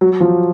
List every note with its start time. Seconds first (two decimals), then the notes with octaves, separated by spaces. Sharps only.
0.01 F#3
0.20 F3